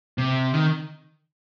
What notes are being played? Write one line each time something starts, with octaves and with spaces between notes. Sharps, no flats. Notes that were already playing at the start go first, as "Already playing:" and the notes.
C3
D#3